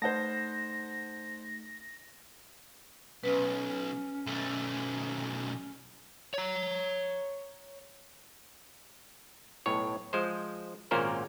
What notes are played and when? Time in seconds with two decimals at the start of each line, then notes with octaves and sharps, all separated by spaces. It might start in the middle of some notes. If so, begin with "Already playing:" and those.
0.02 A3 D#4 C5 F#5 A5 A#6
3.23 B1 C#4 B4
4.27 B1 A3
6.34 C#5 A#5
9.66 B1 A2 C#5
10.13 F3 G#3 C5
10.91 G#1 A#2 A#3 C#4 A#4 C5